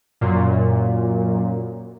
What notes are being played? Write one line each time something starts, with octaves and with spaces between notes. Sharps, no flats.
F#2 A#2